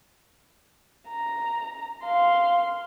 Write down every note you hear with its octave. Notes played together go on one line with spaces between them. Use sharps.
A#5
F5 C6